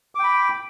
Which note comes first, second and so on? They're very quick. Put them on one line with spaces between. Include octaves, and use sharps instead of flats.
D6 G5 B5